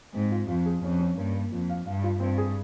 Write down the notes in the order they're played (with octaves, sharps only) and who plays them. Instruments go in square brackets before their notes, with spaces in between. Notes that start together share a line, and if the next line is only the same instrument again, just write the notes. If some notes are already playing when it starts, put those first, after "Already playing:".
[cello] G#2 [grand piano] C4
[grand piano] F4
[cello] F2 [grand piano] F4
[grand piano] G#4
[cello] F2 [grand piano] C#4
[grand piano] C#4
[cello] G2 [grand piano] A#3
[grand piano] A#3
[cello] F2 [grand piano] F4
[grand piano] F5
[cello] G2 [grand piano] F5
[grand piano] F4
[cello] G2 [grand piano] C4
[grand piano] G#4